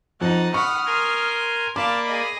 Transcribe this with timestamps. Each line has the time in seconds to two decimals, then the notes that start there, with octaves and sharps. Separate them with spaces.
0.21 F2 D#4 F#5 A5
0.54 F#5 B5 C#6 D#6 F6
0.86 A#4 G#5 C6
1.76 A#3 D5 F5 A5 B5 D6
2.06 G#4 D#5